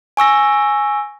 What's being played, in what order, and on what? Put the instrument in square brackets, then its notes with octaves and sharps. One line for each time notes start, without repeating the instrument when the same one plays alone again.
[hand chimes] G#5 C#6 E6 A#6